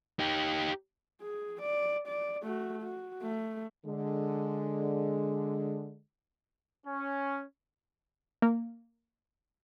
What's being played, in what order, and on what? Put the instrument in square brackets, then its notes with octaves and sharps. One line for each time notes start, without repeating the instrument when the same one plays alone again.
[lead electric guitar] D#4 G4
[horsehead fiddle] G#4
D5
D5
A3 F#4
F#4
A3
[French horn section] D3 G#3
[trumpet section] C#4
[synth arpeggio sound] A#3